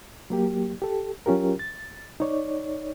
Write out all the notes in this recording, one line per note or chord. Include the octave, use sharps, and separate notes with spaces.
F#3 A#3 G4
G4 A4
F#3 C#4 F4 G4 A#4
A6
D#4 C#5 D5